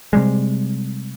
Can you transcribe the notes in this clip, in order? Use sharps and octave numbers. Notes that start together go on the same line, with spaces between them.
C3 G3 G#3